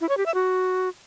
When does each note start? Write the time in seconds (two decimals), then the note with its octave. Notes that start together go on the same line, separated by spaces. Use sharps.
0.01 E4
0.09 C#5
0.17 G4
0.26 E5
0.34 F#4